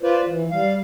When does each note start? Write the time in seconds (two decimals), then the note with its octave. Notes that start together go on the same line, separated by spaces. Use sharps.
0.03 F4 B4 C5 D5
0.27 E3
0.51 G3 F5